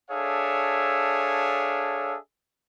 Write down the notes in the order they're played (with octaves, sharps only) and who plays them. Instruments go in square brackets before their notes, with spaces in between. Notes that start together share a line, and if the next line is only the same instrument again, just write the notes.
[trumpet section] D4 G#4 A4 C#5 E5 F5